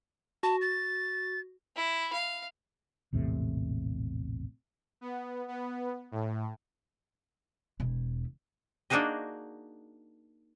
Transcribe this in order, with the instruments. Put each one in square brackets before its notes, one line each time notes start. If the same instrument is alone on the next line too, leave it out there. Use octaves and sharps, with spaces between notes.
[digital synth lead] F#4 [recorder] A5
[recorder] A6
[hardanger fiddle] E4
F5
[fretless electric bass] A#1 E2 A2 C3
[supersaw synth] B3
B3
A2
[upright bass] E1 E4
[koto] A#3 D4 D#4 F#4 G#4 D#5